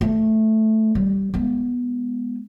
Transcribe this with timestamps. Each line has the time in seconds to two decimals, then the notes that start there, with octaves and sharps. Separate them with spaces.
0.01 A3
0.95 G3
1.34 G#3 B3